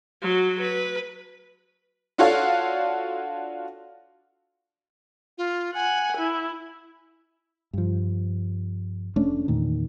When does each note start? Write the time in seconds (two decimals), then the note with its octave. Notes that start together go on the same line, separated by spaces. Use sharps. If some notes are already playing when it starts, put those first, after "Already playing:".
0.22 F#3 F#4
0.61 B4
2.18 D4 F4 F#4 A4 C#5 F5
5.38 F4
5.75 F#5 G#5
6.17 E4
7.73 G2 F3
9.16 F1 A3 C#4 D4
9.48 E2 A#2 D#3